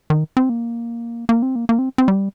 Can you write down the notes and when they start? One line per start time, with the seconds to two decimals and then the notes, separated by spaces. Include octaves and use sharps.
0.10 D#3
0.37 C4
0.49 A#3
1.29 A#3
1.42 C4
1.56 A#3
1.69 A#3
1.79 C4
1.98 C4
2.08 G3